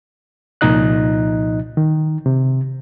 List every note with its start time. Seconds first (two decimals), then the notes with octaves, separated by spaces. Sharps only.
0.61 C2 A#2 F3 D#4 D#5 F#6
1.77 D#3
2.26 C3